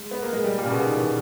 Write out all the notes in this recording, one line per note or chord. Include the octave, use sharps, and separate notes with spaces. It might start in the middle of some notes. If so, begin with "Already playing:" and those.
Already playing: G#3
B3
A#3
G#3
G3
A#2
C#3
B2
D#3
E3